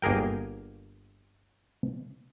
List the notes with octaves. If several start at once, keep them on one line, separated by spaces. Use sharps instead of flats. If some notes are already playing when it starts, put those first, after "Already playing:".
G1 A#3 G#4 A#4 G5